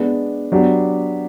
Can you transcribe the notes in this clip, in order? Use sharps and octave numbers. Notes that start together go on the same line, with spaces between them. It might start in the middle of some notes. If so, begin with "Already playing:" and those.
Already playing: G#3 B3 D4
F#3 B3 D4 G4